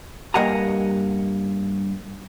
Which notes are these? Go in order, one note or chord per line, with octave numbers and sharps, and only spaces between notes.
G2 A#3 D#5 F#5 G#5 A#5